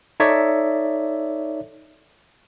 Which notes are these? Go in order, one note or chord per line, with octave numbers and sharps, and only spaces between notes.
D#4 A4 C#5 D5 E5